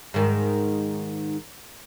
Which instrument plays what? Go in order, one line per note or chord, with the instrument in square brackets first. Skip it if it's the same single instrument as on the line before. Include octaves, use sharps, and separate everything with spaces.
[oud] G#2 D#3